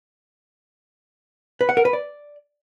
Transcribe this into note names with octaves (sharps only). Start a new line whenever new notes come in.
B4
F#5
A#4
B4
D5